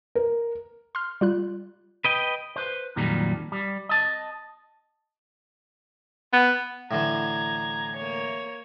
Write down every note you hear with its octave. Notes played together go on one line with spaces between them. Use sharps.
A#4
C6 F6
G3 F4 F#6
B4 D#5 G5
B4 C5
F2 A#2 D#3 F#3 G3
G3
D#5 A5
B3
A2 D3 E3 A#5 G#6
A#3 C#5